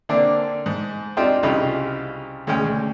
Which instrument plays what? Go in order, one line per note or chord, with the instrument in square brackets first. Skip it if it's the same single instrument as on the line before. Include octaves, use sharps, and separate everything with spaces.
[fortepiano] D3 A#3 C4 D4
G#2
C4 D4 D#4 F4 G4 C5
C2 C#3 D#4 F4 B5
D2 G#3 C#4 G5
D2